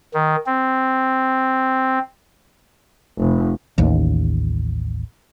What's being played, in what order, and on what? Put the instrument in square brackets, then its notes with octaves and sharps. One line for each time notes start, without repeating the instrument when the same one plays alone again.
[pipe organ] D#3
C4
[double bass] F1
[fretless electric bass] A1 D#2